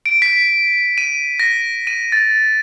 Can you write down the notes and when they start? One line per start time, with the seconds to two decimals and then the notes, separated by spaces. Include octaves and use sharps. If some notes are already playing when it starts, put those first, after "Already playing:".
0.06 D7
0.22 B6
0.98 D#7
1.40 A#6
1.87 D#7
2.12 A6